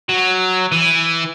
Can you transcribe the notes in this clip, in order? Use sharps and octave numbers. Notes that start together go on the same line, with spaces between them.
F#3
E3